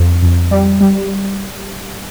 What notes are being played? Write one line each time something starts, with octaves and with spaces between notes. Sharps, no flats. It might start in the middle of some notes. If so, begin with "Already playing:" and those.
Already playing: F2
F2
G3
G3